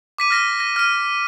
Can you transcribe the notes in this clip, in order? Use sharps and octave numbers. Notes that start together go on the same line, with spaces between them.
D6 B6 D#7
F6 A#6 D#7
A#6
F6 D#7